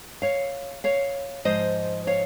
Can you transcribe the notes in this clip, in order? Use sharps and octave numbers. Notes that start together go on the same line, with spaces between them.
C#5 F5
C#5 F5
G#2 F3 C5 D#5
C#5 F5